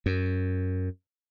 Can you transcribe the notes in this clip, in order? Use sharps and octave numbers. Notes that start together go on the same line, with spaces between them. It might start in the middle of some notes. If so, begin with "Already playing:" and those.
F#2